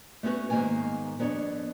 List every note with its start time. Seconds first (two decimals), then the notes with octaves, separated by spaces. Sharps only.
0.23 A3 B3 C#4 F#4 B4
0.50 G#2 D#3 A#3 B3 G#5
1.19 F2 B3 D4 A4 C#5